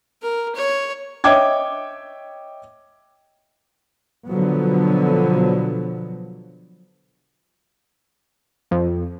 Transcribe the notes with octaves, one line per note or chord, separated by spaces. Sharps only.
A#4
C#5
C#5 D#5 E5 G5 D6 G#6
B2 D3 F3 F#3 B3
F2